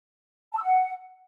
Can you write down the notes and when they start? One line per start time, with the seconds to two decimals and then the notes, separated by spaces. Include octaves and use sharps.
0.52 A5
0.58 E6
0.63 F#5